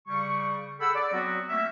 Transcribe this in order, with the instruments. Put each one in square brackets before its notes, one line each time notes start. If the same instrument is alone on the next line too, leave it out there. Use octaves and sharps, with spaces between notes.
[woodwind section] C#3 G3 C#6
G#4 A4 F#5 G5 B5 E6
D5
F#3 B3 C4 F#4
A3 A#3 C4 C#4 E5